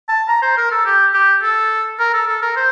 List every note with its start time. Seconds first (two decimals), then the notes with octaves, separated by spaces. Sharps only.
0.09 A5
0.28 A#5
0.42 C5
0.57 A#4
0.71 A4
0.86 G4
1.14 G4
1.42 A4
1.99 A#4
2.14 A4
2.27 A4
2.42 A#4
2.56 C5